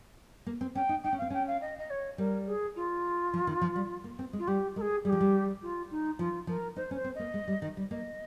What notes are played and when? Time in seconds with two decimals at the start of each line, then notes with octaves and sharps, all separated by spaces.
0.46 A#3
0.61 C4
0.75 C#4 G5
0.89 D#4
1.03 D#4 G5
1.13 C#4
1.18 C4 F5
1.30 C#4 G5
1.47 F5
1.61 D#5
1.78 D#5
1.90 C#5
2.18 G3 A#4
2.47 G#4
2.76 F4
3.33 F3
3.47 D#3
3.61 F3
3.76 G3
4.04 A#3
4.19 C4
4.33 G#3
4.39 F4
4.47 G3 G4
4.76 G#3 A#4
4.81 G#4
5.05 G3 G#4
5.09 F3 G4
5.21 G3
5.62 F4
5.90 D#4
6.19 F3 F4
6.47 F3 A#4
6.76 D#4 C5
6.91 C#4
6.95 C5
7.04 C4
7.15 A#3 D#5
7.34 G#3
7.48 G3
7.62 D#3
7.77 G3
7.91 A#3 D#5